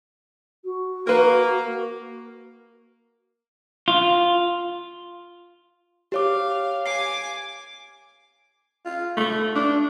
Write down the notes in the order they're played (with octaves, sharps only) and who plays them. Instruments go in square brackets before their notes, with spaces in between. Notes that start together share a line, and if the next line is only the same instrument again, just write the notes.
[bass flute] F#4
[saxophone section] A#3 [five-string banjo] A#4 B4
[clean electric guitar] F4
[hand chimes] G4 C#5 D6 [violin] F5
[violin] G#5 D6 [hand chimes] C7
[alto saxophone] F4
A3
D4